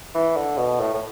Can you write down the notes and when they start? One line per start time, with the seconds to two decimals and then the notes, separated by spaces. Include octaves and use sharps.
0.15 E3
0.37 D3
0.57 B2
0.79 A2
0.94 A2